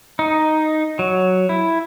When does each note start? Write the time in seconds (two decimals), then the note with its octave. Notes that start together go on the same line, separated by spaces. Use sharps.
0.19 D#4
0.99 F#3
1.49 E4